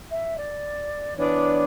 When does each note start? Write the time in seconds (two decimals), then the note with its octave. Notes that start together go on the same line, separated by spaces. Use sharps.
0.11 E5
0.37 D5
1.17 E3 B3 D4 C#5